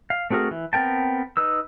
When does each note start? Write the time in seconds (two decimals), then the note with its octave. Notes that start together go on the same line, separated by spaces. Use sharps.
0.10 F5
0.30 A3 C4 F#4 G#4 A#4
0.51 E3
0.73 B3 C4 A#4 G5 A5
1.37 D#4 B4 E6